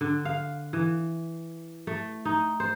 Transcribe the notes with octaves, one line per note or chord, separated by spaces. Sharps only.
D3
F5
E3
A3
D#4
C5